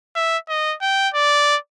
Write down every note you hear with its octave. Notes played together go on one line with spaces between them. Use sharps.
E5
D#5
G5
D5